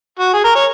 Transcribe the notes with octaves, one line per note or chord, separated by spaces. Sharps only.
F#4
G#4
A#4
C#5